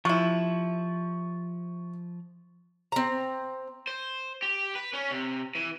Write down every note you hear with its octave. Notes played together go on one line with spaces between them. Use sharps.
C3 F3 E4 C#6
C4 A#5
C5
G4
B4
C#4
C3
E3